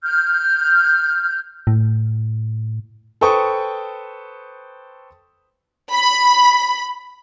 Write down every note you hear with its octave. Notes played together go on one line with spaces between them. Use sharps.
F6 G6
A2
A4 B4 C5 G5 C#6 D#6
B5